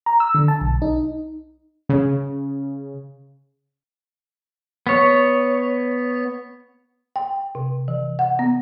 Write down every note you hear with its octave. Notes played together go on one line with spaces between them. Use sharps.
A#5
E6
D3
A5
B1
D#4
C#3
B3 C#5
G5
C3
E3
F#5
B3